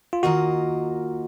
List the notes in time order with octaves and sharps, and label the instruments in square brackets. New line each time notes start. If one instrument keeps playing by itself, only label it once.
[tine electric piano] F4
[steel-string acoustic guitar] D#3 A#3 F4 A#4 D#5 [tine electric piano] F#4